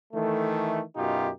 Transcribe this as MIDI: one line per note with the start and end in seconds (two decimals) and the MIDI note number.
0.13 0.82 51
0.13 0.82 52
0.13 0.82 57
0.96 1.29 42
0.96 1.29 47
0.96 1.29 63
0.96 1.29 65
0.96 1.29 67